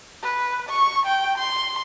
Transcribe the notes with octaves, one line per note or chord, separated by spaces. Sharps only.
B4
C#6
G5
C6